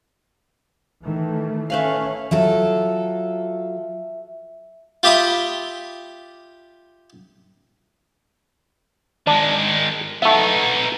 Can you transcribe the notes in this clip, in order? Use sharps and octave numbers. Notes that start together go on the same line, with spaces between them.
D#3 E3 A3
A3 C#4 B4 F5
F#3 F4 A4 E5
F4 G4 E5 B5 D#6
D#3 G#3 D4
A3 B3 D#4 E5